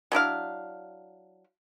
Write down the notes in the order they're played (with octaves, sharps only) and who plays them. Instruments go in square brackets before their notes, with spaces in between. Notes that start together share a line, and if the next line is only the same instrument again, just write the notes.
[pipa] F#3 D4 E4 F5